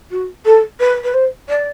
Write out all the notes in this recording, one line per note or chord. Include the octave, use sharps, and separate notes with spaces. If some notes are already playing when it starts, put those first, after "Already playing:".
F#4
A4
B4
B4
C5
D5